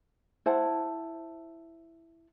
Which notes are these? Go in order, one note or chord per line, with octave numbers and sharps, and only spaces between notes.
E4 C5 F#5 A5